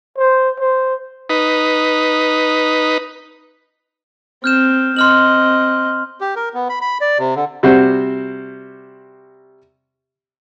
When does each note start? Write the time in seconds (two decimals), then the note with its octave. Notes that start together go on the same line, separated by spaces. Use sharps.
0.18 C5
0.60 C5
1.29 D#4 B4
4.44 C4 F6 G6 E7
4.96 C4 D#5 C6 F6 F#7
6.21 G4
6.36 A#4
6.54 B3
6.69 B5
6.81 B5
7.01 D5
7.19 C3
7.36 D3
7.63 C3 G3 F#4 C5